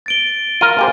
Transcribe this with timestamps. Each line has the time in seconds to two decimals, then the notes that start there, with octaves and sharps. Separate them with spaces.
0.06 A6 D7 G7
0.61 F4 A#4 D#7
0.79 A#3 G4 C5 G#5